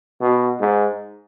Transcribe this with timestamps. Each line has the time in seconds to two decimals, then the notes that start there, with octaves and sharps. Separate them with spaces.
0.21 B2
0.60 G#2